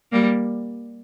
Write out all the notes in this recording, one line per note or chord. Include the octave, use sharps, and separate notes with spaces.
G3 A#3